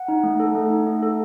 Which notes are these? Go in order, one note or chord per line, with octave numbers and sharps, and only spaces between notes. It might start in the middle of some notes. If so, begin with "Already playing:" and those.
Already playing: F#5
D#4
A3
A4
A3
D#4
A3
A4